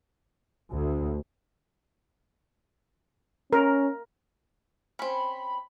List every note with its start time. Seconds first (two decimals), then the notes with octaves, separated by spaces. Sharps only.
0.71 D2
3.53 C#4 A#4
4.99 C4 C#4 B5